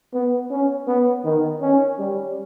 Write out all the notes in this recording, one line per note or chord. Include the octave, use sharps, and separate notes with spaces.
B3
C#4
B3
D#3
C#4
G3